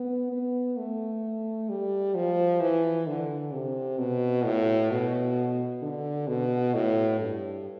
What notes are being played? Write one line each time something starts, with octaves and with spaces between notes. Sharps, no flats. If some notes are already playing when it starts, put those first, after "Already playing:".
Already playing: B3
B3
A3
G3
F3
E3
D3
C3
B2
A2
B2
D3
B2
A2
G2